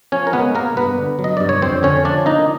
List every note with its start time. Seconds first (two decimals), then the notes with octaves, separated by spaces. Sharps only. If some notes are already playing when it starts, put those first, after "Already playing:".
0.12 F3 C#4 C#5
0.27 A#4
0.33 G#3 B3 B4
0.55 A#3 B3 A#4
0.77 G2 B3 B4
0.98 D3
1.19 F#3
1.24 D#5
1.37 G2 D5
1.49 C#5
1.62 F2 C4 C5
1.83 D3 C#4 C#5
2.05 F3 D4 D5
2.26 A#3 D#4 D#5